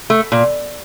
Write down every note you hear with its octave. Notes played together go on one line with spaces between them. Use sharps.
A3
A#2